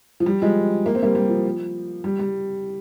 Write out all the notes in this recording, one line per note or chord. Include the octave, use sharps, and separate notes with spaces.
F3
G3
F3 G#3
A#3
C4
G3 A#3
G3
F3
G3
G3